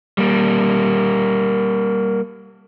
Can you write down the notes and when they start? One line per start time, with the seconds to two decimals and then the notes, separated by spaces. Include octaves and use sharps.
0.18 G3 A#3